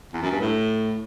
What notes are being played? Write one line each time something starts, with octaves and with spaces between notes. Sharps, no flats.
E2
F#2
G2
A2